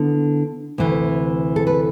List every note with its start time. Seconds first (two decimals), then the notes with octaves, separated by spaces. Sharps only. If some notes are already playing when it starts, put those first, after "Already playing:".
Already playing: D3 B3 E4
0.78 D2 C3 E3
1.56 A4
1.67 B4